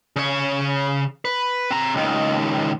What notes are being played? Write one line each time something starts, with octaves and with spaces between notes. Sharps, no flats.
C#3 C#5
B4
C4 A#5
C#2 D#3